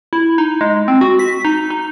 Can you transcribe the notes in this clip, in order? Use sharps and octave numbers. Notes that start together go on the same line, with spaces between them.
E4
D#4
G#3
C4
F#4
B6
D#4
D#4